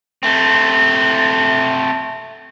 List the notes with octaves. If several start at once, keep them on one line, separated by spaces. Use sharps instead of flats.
A3 C4